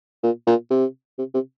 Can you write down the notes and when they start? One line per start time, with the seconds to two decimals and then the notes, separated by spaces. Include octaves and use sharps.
0.23 A#2
0.47 A#2
0.70 C3
1.19 C3
1.34 C3